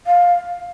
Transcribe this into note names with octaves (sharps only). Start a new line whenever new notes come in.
F5